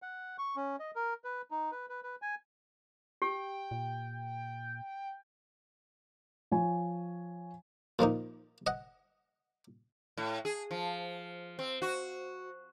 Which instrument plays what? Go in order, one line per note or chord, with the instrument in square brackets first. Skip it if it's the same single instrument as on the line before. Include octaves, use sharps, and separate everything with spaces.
[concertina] F#5
C#6
C#4
D#5
A#4
B4
D#4
B4
B4
B4
G#5
[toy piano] G4 [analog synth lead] G5
[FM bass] A#2
[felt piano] F3 C#5 G#5
[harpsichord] A#2 F3 A#3 D#4
D#5 F#5
[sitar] A2
G#4
F3
C4
F#4